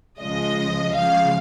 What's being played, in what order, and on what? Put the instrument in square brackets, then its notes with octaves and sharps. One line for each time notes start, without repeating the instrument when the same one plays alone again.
[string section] C#2 C#3 F3 G#3 D#5
C#2 C#3 F3 G#3 F5